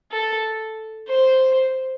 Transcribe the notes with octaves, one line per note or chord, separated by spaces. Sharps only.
A4
C5